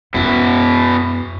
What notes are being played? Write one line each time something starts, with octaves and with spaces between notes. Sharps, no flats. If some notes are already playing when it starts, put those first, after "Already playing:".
F#2 B2 B3 E4